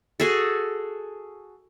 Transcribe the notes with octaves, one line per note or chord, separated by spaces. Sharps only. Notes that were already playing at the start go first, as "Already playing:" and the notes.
F#4 G#4 A4